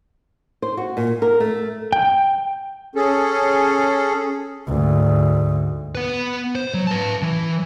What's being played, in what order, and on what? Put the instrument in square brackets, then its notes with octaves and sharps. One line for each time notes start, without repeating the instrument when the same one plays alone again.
[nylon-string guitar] C5
F#4
A#2
A#4
A3
[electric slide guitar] G5
[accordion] C#4 G#4 A4
[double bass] D2 G#2
[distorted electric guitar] B3 B4
C5
F#3
B4 A5
E3